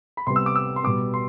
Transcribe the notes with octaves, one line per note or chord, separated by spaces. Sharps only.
B5
C3 G3 B3 C6
E6
D6
E6
C6
B2 G3 B3 D6
C6